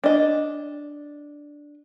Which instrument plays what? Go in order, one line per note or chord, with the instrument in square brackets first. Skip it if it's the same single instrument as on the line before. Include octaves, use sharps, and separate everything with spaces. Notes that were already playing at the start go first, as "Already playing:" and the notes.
[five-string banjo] D4 D#5